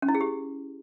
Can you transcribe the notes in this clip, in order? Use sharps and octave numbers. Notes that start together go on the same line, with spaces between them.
C#4
E4
G#4
G4